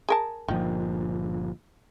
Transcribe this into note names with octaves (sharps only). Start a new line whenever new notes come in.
G#4 A#4 A5
G1 A#2 D#3 F3